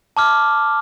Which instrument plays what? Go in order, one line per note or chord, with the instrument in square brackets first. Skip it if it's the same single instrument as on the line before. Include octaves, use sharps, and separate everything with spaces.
[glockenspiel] A5 D6 F6